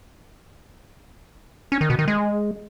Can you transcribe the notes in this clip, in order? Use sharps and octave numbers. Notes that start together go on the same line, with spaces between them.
C#4
D#3
B2
D#3
G#3